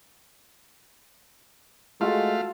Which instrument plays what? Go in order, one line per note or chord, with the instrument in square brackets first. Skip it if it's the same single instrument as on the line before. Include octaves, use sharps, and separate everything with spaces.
[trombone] G#3 [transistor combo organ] A3 F5 [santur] F4 F#4 A4